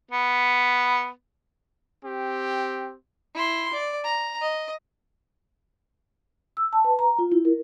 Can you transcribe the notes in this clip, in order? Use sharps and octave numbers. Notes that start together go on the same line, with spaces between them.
B3
C4 G4
E4 C6
D5
A#5
D#5
E6
A5
B4
A#5
F4
E4
A#4